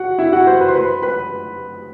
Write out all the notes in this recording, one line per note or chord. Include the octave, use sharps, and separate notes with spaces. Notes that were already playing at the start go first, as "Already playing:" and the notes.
Already playing: F#4 F#5
E4 E5
F#4 F#5
C5
B4 B5
C6
B4 B5
B4 B5